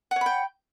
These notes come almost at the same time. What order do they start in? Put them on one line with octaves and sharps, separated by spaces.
F#5 C#5 B5 G5